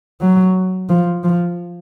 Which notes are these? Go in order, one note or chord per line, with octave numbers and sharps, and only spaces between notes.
F#3
F3
F3